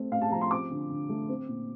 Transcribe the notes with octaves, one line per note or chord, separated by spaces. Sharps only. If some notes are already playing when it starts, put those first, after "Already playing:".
Already playing: A3 C4
A2 F5
A5
F3 A#5
C6
C4 D6
D3
D3
A3
C4
A#2